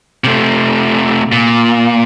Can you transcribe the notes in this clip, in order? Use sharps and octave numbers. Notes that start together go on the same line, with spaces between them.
C3 A3
A#2